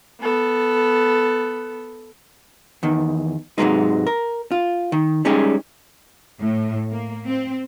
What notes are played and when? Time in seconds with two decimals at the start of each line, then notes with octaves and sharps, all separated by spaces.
0.21 B3 A4
2.83 E2 D#3
3.58 G#2 C3 E3 F#3 G#3 D#4
4.07 A#4
4.51 F4
4.92 D#3
5.25 G3 G#3 C#4 D#4 G4 G#4
6.41 A2
6.91 A#3
7.27 C4